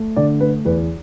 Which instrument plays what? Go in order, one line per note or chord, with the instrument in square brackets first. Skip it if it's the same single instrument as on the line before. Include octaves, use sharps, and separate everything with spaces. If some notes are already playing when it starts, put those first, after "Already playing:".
Already playing: [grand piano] A3
D3 D5
A3 B4
E2 B4